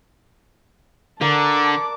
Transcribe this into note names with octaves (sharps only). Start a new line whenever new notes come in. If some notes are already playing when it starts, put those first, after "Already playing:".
D3 A#4 D5 F#5 A5 D6